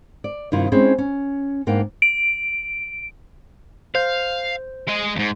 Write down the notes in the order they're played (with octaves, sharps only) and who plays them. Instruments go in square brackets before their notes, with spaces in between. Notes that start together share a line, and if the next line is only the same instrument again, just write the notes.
[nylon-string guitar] D5
G2 C3 D#3 E4 F4
G#3 C4 C#4 D#4 E4 G#4
C#4
G#2 A#3 B3 D4 G5
[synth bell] D7
[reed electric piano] C5 G6 [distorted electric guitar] F5
[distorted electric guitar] G#3 D#5
E2 G#2